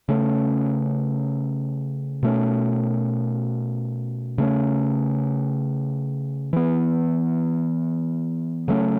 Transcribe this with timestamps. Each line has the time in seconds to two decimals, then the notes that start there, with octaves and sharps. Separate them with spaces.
0.08 C#3 A3 C#4
2.23 B2 A3 C#4
4.38 C#3 A3 C#4
6.53 E3 B3
8.68 C#3 F#3 A3 C#4